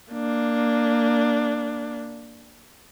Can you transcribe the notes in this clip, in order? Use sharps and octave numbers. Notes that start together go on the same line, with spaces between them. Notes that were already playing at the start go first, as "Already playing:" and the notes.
A#3 D4